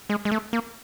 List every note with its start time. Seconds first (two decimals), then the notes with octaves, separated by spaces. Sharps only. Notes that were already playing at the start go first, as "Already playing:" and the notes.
0.10 G#3
0.25 G#3
0.32 A3
0.53 A#3